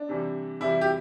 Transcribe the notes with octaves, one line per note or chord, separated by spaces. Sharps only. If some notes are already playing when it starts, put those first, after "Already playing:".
Already playing: D4
C3 E3 G3
C3 E3 G3 E4
G4